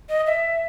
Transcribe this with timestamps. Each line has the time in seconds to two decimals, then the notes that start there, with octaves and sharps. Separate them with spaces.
0.09 D#5
0.27 E5